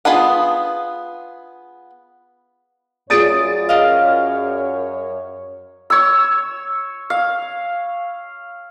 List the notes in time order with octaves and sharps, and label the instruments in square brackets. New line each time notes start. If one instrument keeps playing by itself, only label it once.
[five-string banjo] B3 F4 G#4 B4 F#5
[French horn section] F#2 C#5 [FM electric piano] F4 G#4 D5 [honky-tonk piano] D#6 A6 D7
[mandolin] A#4 D#5 F5
[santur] C#5 E6
F5